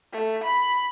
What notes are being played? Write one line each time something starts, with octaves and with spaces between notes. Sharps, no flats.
A3
B5